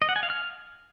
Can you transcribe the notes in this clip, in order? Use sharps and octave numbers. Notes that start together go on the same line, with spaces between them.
D#5
F#5
G#5
F5
F6